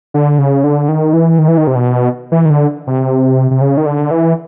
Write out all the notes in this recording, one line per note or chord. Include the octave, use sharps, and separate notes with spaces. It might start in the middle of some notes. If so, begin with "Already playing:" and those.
D3
C#3
D3
D#3
E3
D#3
E3
D#3
C3
B2
E3
D#3
D3
C3
C3
C#3
D#3
D3
E3